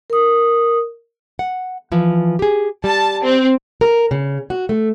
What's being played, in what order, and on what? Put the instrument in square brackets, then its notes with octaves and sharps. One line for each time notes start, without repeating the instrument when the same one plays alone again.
[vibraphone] A#4 D#6
[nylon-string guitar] F#5
E3 F3
G4 G#4
[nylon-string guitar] G3 [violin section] A5
[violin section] C4
[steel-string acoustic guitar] A#4
C#3
F#4
A3